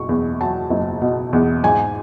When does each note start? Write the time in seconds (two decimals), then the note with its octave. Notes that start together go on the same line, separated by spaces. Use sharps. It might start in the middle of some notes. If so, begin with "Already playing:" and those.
Already playing: F#1 B2 C#6
0.09 E2
0.41 F#3 A5
0.70 F#1
1.01 B2
1.33 E2
1.64 G#2 G#5